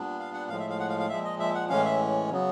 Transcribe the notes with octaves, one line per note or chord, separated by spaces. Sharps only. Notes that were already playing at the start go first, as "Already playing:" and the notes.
Already playing: A#2 G3 B3 D4
F5
F#5
A2 F3 G#3 F5
E5
F5
F#5
F5
F5
A#2 F3 G#3 E5
D#5
E5
F#5
A2 E3 G#3 C#4 F5
E5
C#3 F#3 B3